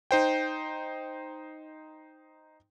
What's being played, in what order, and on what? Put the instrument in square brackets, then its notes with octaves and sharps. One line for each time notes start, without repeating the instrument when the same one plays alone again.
[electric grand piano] D#4 C5 G5